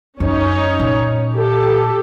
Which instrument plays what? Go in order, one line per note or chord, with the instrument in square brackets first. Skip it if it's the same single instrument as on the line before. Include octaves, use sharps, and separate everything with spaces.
[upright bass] F#2 [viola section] C#4 D#4 C#5
[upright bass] A#2
[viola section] G4 A4